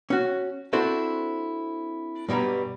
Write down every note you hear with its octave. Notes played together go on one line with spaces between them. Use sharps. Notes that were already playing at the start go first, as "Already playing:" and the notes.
C#4 F#4
C4 D4 E4 F#4 A4 C5
G2 B2 G3 B3 A#5